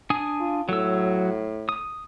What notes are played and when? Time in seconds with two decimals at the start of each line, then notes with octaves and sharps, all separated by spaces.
0.10 D4 G#5 D#6
0.40 F4
0.69 A2 F#3 E6
1.69 D#6